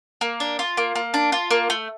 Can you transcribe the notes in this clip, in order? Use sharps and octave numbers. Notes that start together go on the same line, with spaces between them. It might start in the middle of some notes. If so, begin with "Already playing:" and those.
A#3
D4
F4
A#3
A#3
D4
F4
A#3
A3